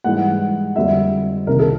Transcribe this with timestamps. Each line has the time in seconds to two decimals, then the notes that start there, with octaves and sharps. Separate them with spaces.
0.04 G#2 E3 G3 F#5
0.76 F2 D3 G3 E5
1.47 C2 C3 D#3 A#4
1.59 A4